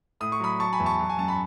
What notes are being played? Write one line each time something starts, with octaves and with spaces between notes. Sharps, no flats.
A2 D#6
C#6
F#3 B5 D#6
F#3 A5 C#6
G#5 B5
E2
A5 C#6
F#3
G#5
F#2 A5
B5